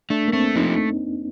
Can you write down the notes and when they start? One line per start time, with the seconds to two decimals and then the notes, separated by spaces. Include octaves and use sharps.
0.10 A3 D4
0.28 A#3
0.33 A3 C4
0.56 F3 D#4